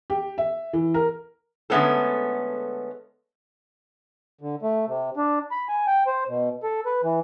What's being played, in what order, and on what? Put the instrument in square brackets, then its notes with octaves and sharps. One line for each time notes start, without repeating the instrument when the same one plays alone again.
[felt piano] G4
E5
E3
A#4
[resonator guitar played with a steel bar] D3 G#3 A3 B3 C#4 A4
[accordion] D3
A3
C3
D4
B5
G#5
G5
C5
B2
A4
B4
E3